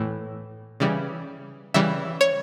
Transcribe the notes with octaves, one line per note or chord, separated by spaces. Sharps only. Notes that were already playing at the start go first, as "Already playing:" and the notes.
Already playing: A2 E3 A3
C#3 E3 G3
C#3 E3 G3 E5
C#5